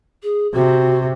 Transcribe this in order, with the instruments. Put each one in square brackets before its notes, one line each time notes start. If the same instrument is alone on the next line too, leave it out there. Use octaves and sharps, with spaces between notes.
[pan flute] G#4
[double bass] C3 [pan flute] F#4